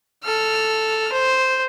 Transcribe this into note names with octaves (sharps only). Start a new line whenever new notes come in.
A4 F6
C5